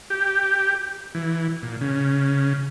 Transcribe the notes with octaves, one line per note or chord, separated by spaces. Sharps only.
G4
E3
A#2
C#3